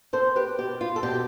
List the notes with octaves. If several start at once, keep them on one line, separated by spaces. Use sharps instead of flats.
C4 A4 C5
G4 B4
B2 G4
F4
A4
B2 G4